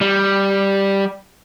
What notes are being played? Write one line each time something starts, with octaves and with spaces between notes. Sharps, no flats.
G3